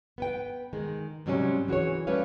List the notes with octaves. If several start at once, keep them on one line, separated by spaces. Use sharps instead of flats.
B3 B4 G5
D#3 G#3
G#2 C3 F#3 G3 C4 C#4
E3 F#4 G#4 C#5
G3 A3 C#4 B4 C#5 F5